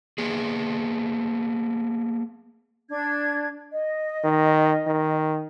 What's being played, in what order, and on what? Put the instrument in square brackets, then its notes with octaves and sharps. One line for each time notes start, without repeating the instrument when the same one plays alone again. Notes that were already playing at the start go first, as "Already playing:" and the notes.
[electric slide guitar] A#3 B3 G#4
[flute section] D4 G#6
D#5
[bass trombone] D#3
D#3